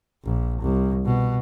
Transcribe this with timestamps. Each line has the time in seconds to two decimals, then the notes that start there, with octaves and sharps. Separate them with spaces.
0.24 A#1
0.61 C2
1.05 B2